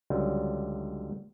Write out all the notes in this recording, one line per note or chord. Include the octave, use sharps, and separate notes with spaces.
C#2 D3 F#3 G3